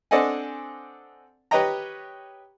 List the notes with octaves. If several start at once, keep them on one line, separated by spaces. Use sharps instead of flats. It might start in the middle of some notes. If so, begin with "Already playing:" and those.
C4 D4 A4 D#5 F#5 G#5
G4 B4 C#5 D#5 G5 A#5